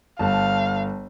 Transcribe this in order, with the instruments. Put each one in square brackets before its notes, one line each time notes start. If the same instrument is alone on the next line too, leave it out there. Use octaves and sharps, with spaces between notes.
[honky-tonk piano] G1 A5 [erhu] F5